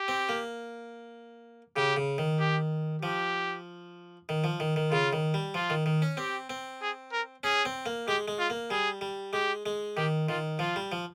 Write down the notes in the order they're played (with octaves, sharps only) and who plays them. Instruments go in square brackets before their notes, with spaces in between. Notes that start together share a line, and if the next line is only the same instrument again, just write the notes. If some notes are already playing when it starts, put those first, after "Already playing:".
Already playing: [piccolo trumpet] G4
[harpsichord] C4
A#3
[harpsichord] C#3 [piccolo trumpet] G4
[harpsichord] C#3
D#3
[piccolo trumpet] G4
[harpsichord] F3 [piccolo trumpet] G4
[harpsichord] D#3
F3
D#3
D#3
[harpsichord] C#3 [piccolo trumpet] F4
[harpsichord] D#3
G3
[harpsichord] F3 [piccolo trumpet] F4
[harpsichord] D#3
D#3
C#4
[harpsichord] C4 [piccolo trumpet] G4
[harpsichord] C4
[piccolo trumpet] G#4
A#4
[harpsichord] C#4 [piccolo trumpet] G#4
[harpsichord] C4
A#3
[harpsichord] G#3 [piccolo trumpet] G4
[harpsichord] G#3
[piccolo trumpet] F4
[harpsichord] A#3
[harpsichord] G3 [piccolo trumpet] G#4
[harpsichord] G3
[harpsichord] G#3 [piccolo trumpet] G4
[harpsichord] G#3
[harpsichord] D#3 [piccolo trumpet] G4
[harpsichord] D#3 [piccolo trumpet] F4
[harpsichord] F3 [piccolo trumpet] F4
[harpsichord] G3
F3